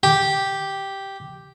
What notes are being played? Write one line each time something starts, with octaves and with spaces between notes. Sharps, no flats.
G4